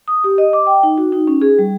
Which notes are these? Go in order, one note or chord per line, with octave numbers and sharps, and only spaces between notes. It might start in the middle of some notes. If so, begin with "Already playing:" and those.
D#6
G4
D#5
D6
G5
D#4
F#4
D#4
C#4
G#4
G3